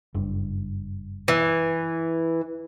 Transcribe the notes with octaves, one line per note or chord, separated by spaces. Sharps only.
F#1 G2
E3